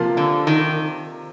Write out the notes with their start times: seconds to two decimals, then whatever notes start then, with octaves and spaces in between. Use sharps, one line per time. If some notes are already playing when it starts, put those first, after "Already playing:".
Already playing: C3 F3 A#3 F4
0.17 D3
0.47 D#3